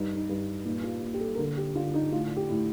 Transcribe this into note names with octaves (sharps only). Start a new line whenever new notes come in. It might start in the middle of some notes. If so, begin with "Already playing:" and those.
Already playing: G2 D#4
D#4
G2
A#2 D#4
F4
A#2
G4
A4
A#4
D3 A4
G4
D3 F4
D#4
A2 F4
G4
A2